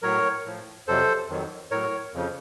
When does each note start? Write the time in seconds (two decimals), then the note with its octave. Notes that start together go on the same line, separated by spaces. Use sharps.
0.02 A2 F#3 A#4 C#5
0.46 A2 F3
0.87 F2 C3 F#3 A4 C5
1.30 F2 D#3 F#3
1.71 A2 F#3 A#4 C#5
2.14 F2 C#3 F3